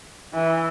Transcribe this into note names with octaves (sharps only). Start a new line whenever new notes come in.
E3